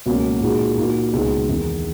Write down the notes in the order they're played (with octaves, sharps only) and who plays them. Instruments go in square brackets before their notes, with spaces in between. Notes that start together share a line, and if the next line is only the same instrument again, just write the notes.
[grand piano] C#2 B2 F#3 A#3 C#4
A#2 G#3 D#4 F#4
A#2 A#3 D#4 F#4
C#2 B2 G#3 B3 D#4
E2 D#3 G#3 D#4